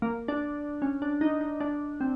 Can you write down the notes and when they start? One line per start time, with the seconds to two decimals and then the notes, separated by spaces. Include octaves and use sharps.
0.02 A#3
0.28 D4
0.82 C#4
1.02 D4
1.21 D#4
1.41 D#4
1.60 D4
2.01 C4